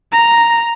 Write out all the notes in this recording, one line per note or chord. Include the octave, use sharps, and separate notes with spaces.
A#5